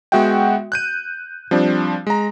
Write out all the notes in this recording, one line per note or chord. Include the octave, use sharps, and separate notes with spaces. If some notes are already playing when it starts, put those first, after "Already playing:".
G#3 B3 F#4 E5 F#5 G5
F#6 G6 D#7
F3 G3 C4 D4
G#3 A#5